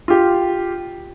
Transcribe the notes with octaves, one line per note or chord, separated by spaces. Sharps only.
F4 G4